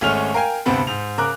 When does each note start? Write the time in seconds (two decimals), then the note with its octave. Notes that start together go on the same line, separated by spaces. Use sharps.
0.01 G#1 G#3 A3 C#4 F6 F7
0.34 A#4 F5 G5 G#5
0.66 D2 G2 C3 B3 C4 B5
0.87 G#2 F7
1.18 C#3 A#4 D6 F#6